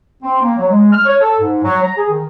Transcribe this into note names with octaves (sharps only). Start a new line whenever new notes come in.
C4
A#3
F#3
G#3
F6
C#5
A4
G#2
F#3
A#5
G#4
D#3